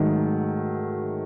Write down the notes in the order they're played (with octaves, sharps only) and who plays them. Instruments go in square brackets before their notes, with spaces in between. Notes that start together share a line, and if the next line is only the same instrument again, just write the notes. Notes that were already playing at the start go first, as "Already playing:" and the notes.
Already playing: [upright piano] G#2 D#3 F#3 A3